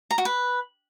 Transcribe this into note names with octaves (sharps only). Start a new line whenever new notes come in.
A#5
F#4
B4